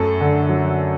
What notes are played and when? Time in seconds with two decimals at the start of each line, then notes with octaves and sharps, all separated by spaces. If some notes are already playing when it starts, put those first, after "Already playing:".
Already playing: F#2 A3 A4
0.21 D3
0.49 F#3